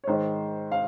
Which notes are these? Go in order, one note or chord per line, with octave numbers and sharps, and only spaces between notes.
C#5
G#2 D#3 G#3 C5
F5